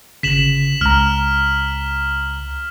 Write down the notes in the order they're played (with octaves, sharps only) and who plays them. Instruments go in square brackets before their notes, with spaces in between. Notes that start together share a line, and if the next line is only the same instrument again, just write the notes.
[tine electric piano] G1 C#3 [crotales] B6 E7 F#7
[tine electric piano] C#2 A#5 [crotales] F6